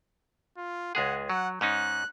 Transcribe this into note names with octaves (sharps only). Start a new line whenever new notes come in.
F4
C#2 G#3 G#4 F#5
F#3 F#5
G#2 C#4 D#4 F#6